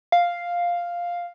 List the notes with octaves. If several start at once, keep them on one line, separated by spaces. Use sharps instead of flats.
F5